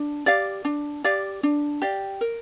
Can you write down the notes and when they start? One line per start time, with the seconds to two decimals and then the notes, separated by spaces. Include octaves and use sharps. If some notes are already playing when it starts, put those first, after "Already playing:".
Already playing: D4
0.26 G4 D5 F5
0.65 D4
1.04 G4 D5 F5
1.43 D4
1.82 G4 D5 F5
2.21 A#4